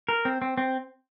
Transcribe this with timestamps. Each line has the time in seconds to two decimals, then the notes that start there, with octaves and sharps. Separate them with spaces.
0.09 A#4
0.25 C4
0.42 C4
0.58 C4